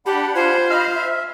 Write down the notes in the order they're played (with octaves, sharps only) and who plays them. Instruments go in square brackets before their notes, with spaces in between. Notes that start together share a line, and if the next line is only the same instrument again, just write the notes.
[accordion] D4 F#5 B5 [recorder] G4 [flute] A5
[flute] F4 [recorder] C5 [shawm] G#5
[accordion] D#5 B5 F6 [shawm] F5
[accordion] E5